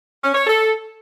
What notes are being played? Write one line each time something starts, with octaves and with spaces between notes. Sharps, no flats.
C#4
C#5
A4